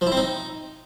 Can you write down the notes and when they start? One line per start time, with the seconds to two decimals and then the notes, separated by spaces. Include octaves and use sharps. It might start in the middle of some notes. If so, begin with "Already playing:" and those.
0.01 F3
0.07 E4
0.12 C4
0.17 D#4